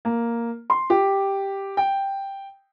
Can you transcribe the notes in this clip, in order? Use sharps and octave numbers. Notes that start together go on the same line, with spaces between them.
A#3
C6
G4
G5